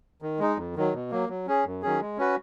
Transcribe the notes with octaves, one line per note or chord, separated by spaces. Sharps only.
D#3
G#3 D#4
F2
D#3 F#3
B2
F#3 A#3
F#3
C#4 G#4
F#2
D#3 F#3 C#4 G#4
G#3
C#4 F#4 B4